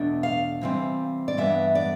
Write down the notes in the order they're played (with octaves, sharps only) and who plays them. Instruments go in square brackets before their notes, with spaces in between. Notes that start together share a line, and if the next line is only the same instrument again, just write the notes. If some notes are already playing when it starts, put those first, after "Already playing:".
Already playing: [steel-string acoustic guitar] E2 B2 A3 D4
F5
C3 E3 G3 C4
D5
G2 E3 G3 B3 D4 E5
D5